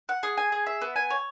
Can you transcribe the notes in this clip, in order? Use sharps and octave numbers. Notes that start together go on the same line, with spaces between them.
F#5
G#4
G#5
G#4
E5
B3
G#5
C#5